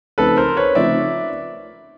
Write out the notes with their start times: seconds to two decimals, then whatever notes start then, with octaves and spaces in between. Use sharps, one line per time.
0.18 C#3 F3 A3 C4 D#4 A4 B4
0.37 A#4 C5
0.57 B4 C#5
0.75 C#3 F3 A3 C4 D#4 D5 E5